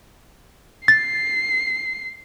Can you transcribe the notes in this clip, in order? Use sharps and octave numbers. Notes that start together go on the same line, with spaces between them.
A6 C7